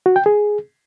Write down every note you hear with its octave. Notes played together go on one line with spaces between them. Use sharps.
F#4
G5
G#4